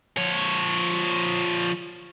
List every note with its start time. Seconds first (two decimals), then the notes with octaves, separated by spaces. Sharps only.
0.17 F3 C#5